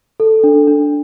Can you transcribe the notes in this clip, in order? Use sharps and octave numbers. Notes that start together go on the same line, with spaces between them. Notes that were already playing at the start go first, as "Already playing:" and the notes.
A4
D4
D4